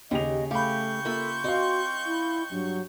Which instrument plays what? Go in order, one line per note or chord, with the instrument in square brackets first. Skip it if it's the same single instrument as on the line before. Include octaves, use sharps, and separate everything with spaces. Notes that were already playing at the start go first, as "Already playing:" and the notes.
[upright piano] D#2 G4 F7 [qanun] C#3 [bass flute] D#5
[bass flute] A3 [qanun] G4 [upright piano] F5 B5 [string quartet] C#6 G6
[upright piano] A#3 [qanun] F4 E5 B5 [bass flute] A4
[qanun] C4 [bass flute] F#4 [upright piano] D#5 F5
[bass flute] E4
[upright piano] G2 [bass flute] F#3